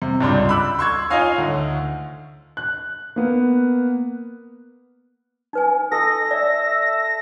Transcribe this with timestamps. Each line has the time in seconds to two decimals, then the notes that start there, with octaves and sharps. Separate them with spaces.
0.02 C3
0.20 C#2 G2 D4 C6
0.49 B5 D6 E6 F#6
0.79 C6 C#6 E6 G#6
1.10 D#4 F4 C#5 D#5 F5 G#5
1.38 D2
2.57 F#6
3.16 A#3 B3
5.53 D#4 B4 G#5
5.92 A4 D#5 A#6
6.31 D5 E5
6.62 E5